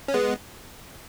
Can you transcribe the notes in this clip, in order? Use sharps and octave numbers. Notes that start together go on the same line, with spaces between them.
C#4
G#3 B3